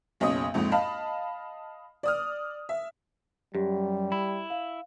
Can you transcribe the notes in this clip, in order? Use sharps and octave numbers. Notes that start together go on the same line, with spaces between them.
F#1 B1 C#4 D#5 D#6
A#1 F2 G#2
D#5 F5 A5 B5
D5 D#6 F6
E5
F#2 G3 G4
E4 B5
F5